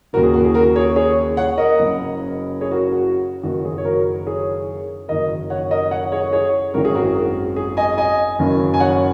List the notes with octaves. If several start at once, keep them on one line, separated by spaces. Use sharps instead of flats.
D#2 C#3 F#4 A#4
G#4
F#4
G#4
F#4 A#4
G#4 C#5
G#4 C#5
C#5 F#5
A#4 D#5
F#1 F#2 C#3
G#4 C#5
F#4 A#4
F#4
F#1 F#2 D#3 F#4
G#4
C#5
F#4 A#4
G#4 C#5
F#1 F#2 D#3 A#4 D#5
C#5 F#5
A#4 D#5
C#5 F#5
G#4 C#5
G#4 C#5
G#1 F#2 D#3 F#4 A#4
G#4
F#4 A#4
G#4
F#4
G#4
D#5 G#5
D#5 G#5
F#1 F#2 D#3
G#5
C#5 F#5